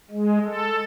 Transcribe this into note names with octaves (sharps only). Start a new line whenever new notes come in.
G#3
A4